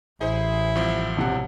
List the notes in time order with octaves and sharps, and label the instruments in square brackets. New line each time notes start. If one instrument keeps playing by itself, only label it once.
[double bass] A1 [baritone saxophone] E4 [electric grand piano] G#4 C5
[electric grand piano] C2 F3 C4
[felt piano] E1 C3 F#5